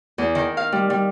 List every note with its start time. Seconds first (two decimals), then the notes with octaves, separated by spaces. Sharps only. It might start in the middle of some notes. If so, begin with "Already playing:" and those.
0.18 E2
0.35 D#3
0.57 F5
0.72 G3
0.90 G3